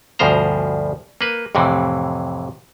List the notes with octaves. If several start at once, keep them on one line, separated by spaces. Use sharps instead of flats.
D2 G2 B2 F3 C5 A#5
A#3 B4
F2 A2 C3 E3